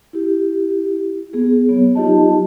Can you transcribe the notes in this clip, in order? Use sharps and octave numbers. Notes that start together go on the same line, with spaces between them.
E4 G4
B3 G#4
F#3 B3 C#5
F#3 D#4 F4 G4 D#5 A5